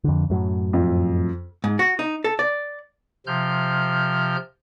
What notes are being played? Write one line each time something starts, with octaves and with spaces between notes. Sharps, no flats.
F2 D3
F#2 A2 F#3
F2
G#2
F#4
D#4
A4
D5
C3 F3 F6 G6